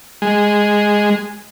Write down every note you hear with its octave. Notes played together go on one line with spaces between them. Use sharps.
G#3